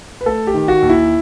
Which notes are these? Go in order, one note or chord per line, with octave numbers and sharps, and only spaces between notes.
B4
A3 A4
G4
D#3
F#4
D#2
E4